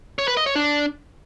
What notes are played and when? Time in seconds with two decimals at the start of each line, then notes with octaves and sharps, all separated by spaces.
0.19 C#5
0.28 B4
0.37 D#5
0.46 C#5
0.55 D4